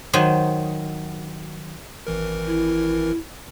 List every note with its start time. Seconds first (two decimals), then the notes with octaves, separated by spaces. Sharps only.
0.13 D#3 F#3 C5 D#5
2.07 G#1 E3 A#4
2.47 E4